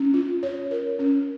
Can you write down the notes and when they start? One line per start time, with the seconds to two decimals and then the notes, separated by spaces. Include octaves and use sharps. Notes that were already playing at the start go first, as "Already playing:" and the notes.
Already playing: C#4
0.14 F4
0.43 C#5
0.71 A#4
0.99 C#4